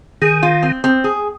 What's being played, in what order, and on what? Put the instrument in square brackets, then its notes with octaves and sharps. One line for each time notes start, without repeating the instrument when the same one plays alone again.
[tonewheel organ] D#3 [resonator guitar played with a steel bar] G#4
[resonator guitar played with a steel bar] F4
C4
C4
G#4